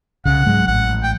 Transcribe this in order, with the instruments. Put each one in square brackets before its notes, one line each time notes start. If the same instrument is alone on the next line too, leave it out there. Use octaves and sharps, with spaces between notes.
[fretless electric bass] C2 C#3 [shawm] F#5
[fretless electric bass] G#2 F#3 G#3
[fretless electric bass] A1 [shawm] F#5
[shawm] G5